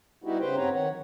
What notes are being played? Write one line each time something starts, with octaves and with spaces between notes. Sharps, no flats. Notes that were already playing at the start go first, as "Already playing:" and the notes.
G3 B3 D#4 E4 F#4 G4
C#3 G4 B4 C5 G5
G2 B3 C4 B4 C#5 A#5
D#3 C#5 F#5
D#3 F#3